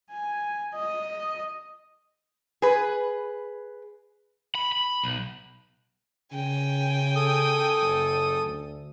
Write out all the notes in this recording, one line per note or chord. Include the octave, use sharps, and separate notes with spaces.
G#5
D#5
G#4 B4
B5
B5
B1
C#3 G5 G#5
A4 D#6
F#1
D2